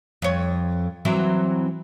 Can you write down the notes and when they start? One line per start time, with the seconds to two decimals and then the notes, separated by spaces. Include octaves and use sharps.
0.22 F2 C#5
1.05 E3 F#3 C4